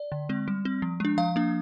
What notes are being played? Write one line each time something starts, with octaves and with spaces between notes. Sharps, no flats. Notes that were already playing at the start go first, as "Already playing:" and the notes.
Already playing: D5
D3
G#3 C4
G3
C4
F3
G#3 D4
F3 F5
A#3 D4